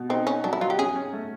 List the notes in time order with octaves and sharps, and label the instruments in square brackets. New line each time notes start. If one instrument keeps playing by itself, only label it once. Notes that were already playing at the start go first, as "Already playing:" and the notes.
Already playing: [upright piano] B2
[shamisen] C4 [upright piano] D#4
[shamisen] C#4 [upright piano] D#4
[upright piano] F#3 [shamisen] D4
[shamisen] E4
[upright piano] F#3 [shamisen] F4
[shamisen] G4
[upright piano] C#4 [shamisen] G#4
[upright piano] C#4
A3